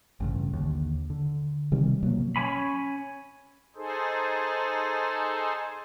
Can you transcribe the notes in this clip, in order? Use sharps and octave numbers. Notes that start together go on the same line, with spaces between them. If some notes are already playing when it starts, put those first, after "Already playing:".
A1 G2 C#3
D#2 D3
D3
C3 D#3 G3
B2 F3 F#3 A#3
C#4 C#5 G#5 B5
D#4 G#4 A4 C5